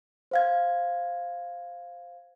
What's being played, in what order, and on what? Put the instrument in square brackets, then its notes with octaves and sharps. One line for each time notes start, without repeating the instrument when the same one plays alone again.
[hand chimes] C5 F5 G#6